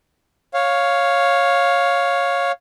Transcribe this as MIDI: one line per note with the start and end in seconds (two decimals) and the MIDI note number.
0.54 2.52 73
0.54 2.52 77